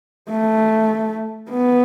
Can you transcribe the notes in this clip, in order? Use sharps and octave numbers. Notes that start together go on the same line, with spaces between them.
A3
B3